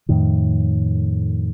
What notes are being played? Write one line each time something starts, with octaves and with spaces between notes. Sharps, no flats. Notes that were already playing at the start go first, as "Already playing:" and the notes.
F2 A2 D#3